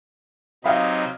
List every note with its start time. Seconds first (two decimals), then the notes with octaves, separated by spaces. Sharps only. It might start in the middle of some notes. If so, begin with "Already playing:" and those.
0.64 C3 F#3 D#4 D#5 F5 B5